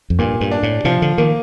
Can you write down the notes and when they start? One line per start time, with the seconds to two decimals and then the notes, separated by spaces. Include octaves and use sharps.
0.10 F2
0.19 G2 A#2
0.41 G2
0.51 D4
0.63 A2
0.85 C3 F3
1.02 D3
1.18 D#3 A#3